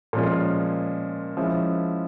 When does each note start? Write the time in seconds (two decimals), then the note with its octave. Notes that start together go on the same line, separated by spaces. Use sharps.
0.13 A#2 F3 G#3 C#4 F4
1.37 F3 G#3 C#4 E4